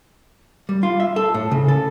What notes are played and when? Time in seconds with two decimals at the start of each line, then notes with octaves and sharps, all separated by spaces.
0.69 G3
0.83 F4
1.00 E5
1.16 A4
1.34 A2
1.51 C#3
1.68 A4